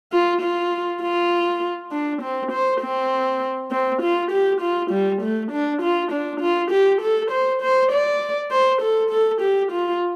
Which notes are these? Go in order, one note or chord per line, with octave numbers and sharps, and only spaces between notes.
F4
F4
F4
D4
C4
C5
C4
C4
F4
G4
F4
G3
A3
D4
F4
D4
F4
G4
A4
C5
C5
D5
C5
A4
A4
G4
F4